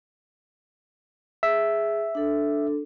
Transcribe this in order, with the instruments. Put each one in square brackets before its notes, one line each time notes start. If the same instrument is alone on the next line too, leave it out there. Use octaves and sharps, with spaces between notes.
[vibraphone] G#4 [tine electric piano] E5
[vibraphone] D4 A4